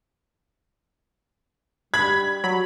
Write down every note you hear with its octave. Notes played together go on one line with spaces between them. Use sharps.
G3 B5 G#6
F#3 B5